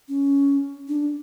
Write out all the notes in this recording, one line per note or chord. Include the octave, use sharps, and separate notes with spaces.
C#4
D4